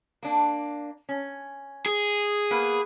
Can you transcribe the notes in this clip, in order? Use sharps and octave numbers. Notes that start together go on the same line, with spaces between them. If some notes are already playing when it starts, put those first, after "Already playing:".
A#3 D4
C#4
G#4
A#3 B3 B4